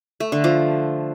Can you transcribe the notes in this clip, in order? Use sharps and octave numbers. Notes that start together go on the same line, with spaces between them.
A3
D3
F3